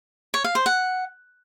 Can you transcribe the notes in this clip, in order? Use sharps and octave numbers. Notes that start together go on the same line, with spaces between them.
C#5
F5
C5
F#5